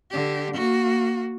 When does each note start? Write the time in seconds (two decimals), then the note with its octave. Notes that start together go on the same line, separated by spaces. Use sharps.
0.10 D3 G4
0.54 A#3 F#4